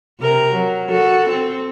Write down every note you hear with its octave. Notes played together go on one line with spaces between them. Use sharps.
C3 A#4
F#3
F#4 A4
C4